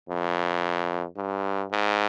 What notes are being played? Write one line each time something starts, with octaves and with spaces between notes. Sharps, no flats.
F2
G2
G#2